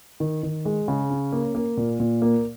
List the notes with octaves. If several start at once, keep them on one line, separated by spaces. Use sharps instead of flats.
D#3
D#3
G#3
C#3
C#4
A#3
A#3
A#2
A#2
A#3